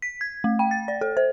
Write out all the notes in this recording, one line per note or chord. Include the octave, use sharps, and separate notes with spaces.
B6
G#6
A3
G5
A6
D5
A4
C5